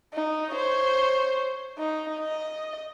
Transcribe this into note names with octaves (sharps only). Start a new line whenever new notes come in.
D#4
C5 C#5
D#4
D#5